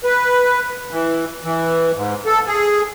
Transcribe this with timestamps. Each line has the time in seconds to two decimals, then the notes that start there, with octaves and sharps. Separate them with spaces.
0.04 B4
0.91 E3
1.44 E3
1.95 G#2
2.26 A4
2.47 G#4